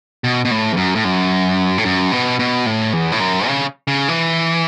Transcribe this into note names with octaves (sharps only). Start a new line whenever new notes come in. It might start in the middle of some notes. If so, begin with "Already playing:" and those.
B2
B2
A2
E2
F#2
A2
F#2
A2
F#2
B2
B2
A2
E2
A2
F#2
C#3
C#3
E3